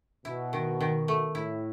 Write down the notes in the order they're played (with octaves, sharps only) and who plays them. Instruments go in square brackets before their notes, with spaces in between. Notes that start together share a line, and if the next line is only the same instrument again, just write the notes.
[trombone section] B2 [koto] E4
[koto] D#3
D#3
A3
[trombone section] A2 [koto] E4